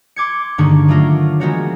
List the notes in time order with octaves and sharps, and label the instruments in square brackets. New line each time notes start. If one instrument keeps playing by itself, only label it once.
[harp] C6 D6 G#6 C#7
G2 D3 D#3 A#3 D#4 C#6
F#3 A3 A#3 F4 A#4
F3 G#3 B3 F#4 A#4 C#5